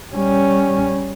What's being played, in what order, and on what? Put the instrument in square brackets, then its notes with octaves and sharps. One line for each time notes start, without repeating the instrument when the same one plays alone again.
[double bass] G3 C#4